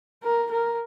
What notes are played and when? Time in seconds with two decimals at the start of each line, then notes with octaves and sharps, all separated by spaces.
0.23 A#4
0.51 A#4